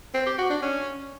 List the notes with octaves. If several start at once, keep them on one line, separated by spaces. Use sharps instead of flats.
C4
G4
F#4
D4
C#4